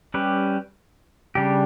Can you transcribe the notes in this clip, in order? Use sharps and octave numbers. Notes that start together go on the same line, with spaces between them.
G3 C#4 G4 B4
C#3 G3 D4 G4